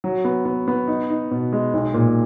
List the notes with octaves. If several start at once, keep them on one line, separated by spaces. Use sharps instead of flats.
F#3
B3
B3
B3
D#4
D#4
B2
G#3
B1
A#2